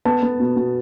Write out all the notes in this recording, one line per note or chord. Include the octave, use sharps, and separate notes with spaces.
B3 A5
B3
B2
B2